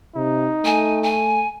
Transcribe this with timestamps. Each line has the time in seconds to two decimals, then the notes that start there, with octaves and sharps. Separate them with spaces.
0.16 C3 D#4
0.65 A3 G#5
1.03 G#5